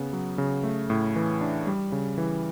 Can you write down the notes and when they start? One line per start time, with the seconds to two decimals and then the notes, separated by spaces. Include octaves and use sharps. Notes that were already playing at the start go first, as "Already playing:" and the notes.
Already playing: C#3 B3
0.13 F#3
0.38 C#3
0.64 A3
0.90 A2
1.16 E3
1.41 D4
1.67 G3
1.92 C#3
2.18 E3